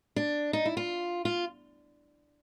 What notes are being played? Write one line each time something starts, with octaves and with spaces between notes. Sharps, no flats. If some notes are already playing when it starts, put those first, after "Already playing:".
D4
D#4
E4
F4
F4